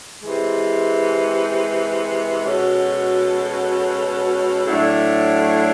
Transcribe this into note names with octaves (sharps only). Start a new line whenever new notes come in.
C3 E3 G#3
B2 G#3 C#4 F#4 A4
A2 F#3 A3 D4